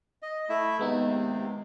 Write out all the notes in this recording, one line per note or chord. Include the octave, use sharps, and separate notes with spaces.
D#5
A3 E4 E5
D#2 C3 G#3 B3 D#4